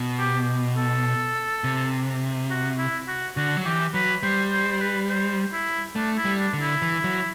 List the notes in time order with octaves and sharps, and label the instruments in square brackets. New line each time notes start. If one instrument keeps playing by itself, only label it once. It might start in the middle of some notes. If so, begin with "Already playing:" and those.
Already playing: [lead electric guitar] B2
[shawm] G4
A4
[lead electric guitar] C3
[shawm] F#4
E4
F#4
[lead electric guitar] D3 [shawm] F#4
[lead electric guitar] F#3
[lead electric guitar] E3 [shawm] G4
[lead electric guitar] F#3 [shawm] B4
[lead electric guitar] G3 [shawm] C5
[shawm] C5
C5
B4
C5
E4
[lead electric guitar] A3 [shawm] D4
[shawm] E4
[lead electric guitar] G3
[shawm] D4
[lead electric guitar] D3
[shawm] E4
[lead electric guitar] E3
F#3